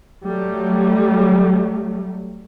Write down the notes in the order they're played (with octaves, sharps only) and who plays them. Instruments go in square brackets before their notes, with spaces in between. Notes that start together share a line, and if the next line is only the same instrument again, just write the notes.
[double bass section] F#3 G3 A3